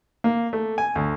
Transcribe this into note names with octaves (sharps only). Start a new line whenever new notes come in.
A#3
A3
G#5
D2